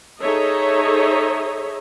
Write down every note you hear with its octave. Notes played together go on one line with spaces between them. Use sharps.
D#4 G#4 A4 C#5 D#5 E5